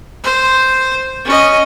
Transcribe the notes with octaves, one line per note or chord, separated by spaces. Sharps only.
C5
C#4 D#5